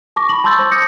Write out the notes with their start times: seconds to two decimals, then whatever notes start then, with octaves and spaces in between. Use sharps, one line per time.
0.16 A5 C#6 D6 A#6
0.29 B5 F#7
0.44 A5 C6 C#6 E6 G6 A6
0.59 C5
0.71 D6 D#6 G6 A#6 C#7